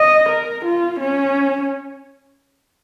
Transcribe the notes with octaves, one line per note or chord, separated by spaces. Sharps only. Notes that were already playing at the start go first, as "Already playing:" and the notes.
Already playing: D#5
A#4
F4
C#4